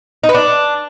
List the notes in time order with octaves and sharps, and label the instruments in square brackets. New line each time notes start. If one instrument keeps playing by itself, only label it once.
[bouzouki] D#4
B3
D4